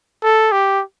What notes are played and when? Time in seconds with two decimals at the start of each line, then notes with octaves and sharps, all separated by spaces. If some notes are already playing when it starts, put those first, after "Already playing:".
0.23 A4
0.52 G4